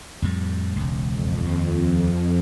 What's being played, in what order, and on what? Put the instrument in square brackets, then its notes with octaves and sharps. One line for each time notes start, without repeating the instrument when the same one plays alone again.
[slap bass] F2 A2 G3
E1 C#2
[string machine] F2
[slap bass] D#2